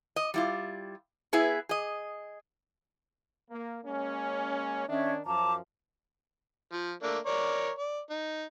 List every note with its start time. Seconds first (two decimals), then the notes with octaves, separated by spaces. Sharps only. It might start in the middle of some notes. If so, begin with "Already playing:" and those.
0.16 D#5
0.34 G3 E4 F4
1.33 B3 E4 G#4 B4 E5
1.69 G#4 D#5
3.50 A#3
3.84 G#3 A#3 C#4
4.87 D#3 C#4 D4 E5
5.25 F#2 F3 A5 A#5 D6
6.72 F3
7.03 A3 A#3 D4
7.26 A#4 C#5 D5
7.79 D5
8.10 D#4